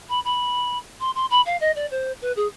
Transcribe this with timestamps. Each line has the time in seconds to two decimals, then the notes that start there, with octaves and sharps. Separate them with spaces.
0.09 B5
0.24 B5
1.00 C6
1.15 C6
1.30 B5
1.45 F5
1.60 D#5
1.75 D5
1.90 C5
2.21 B4
2.36 G#4